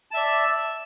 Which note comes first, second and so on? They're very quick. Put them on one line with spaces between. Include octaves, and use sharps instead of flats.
A5 E5 D5